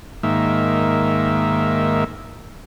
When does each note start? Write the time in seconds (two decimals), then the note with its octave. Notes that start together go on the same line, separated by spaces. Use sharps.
0.23 G#2 D#3 A#3 E5